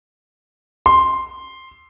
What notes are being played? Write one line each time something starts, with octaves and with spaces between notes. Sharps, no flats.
C6